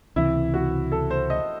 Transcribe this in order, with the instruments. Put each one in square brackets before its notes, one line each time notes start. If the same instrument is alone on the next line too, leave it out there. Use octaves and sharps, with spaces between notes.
[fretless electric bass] C#2 C3 E3 [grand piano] E4
[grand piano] F#4
A4
C5
D#5